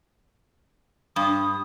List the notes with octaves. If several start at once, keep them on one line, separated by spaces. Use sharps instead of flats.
G2 D#6